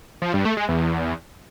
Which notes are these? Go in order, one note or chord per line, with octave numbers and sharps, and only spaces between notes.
F3
G2
A3
G#3
E2